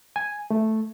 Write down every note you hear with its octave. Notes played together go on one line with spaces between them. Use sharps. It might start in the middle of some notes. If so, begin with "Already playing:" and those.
G#5
A3